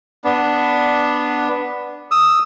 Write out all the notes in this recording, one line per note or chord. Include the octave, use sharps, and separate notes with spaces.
B3 D4
D#6 E6